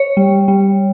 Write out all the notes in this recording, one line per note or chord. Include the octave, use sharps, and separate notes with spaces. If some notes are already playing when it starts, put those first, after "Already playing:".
Already playing: C#5
G3
G3